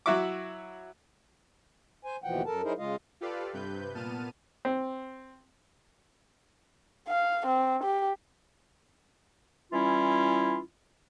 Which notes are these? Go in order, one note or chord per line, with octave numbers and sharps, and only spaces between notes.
F#3 E4 F#4 E5 C#6 D6
C5 G#5
D#2 B2 E3 F3 F#5 G5
F#2 A4 A#4 A5
F#3 D#4 E4 G#4 A#4 C5
C#3 G#3 F4 D#5 F5
F4 G4 A4 B4 D5 F5
G2 C3 B4 G6
A#2 B3 A5 F6 D#7
C4
F5
C4
G4
E3 G3 C#4 E4 F4